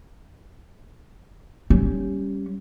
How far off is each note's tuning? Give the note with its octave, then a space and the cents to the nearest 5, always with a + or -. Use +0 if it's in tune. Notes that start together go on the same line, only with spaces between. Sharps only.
G3 +0 C#4 +0